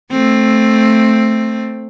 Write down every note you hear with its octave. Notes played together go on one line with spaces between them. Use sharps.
A3 C4